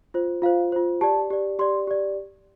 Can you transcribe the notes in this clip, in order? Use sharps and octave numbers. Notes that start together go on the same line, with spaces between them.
F4 C5
F4 C5 F5
F4 C5
G4 D5 A5
G4 D5
G4 D5 C6
G4 D5